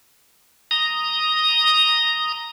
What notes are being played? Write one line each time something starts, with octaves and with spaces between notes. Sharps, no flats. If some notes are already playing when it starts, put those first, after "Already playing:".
A#5 D#6